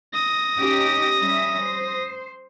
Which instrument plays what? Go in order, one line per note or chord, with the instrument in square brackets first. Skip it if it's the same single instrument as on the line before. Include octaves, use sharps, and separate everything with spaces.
[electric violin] D#6 A#6
[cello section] C#4 D#4 G4
G3 C#4 E5
C5